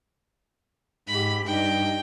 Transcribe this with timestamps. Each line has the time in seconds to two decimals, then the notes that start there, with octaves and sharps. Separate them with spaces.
1.07 G#2 G4 B5
1.46 G2 D#4 G5